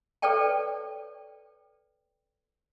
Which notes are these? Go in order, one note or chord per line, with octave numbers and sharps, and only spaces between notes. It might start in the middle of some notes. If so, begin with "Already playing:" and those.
A4 B4 C#5 D5 G5 A5